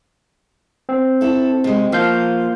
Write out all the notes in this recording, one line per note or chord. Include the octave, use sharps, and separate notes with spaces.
C4
E4 A4
C3 G#3
F3 A#3 F4 F5 G6